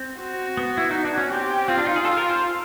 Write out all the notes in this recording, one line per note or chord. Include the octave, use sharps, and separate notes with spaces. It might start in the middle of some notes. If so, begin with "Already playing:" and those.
Already playing: C4
F#4
B3
E4
D#4
D4
C#4
C4 G4
C4 F4
D4
D#4
G#4
A4
A#4
C5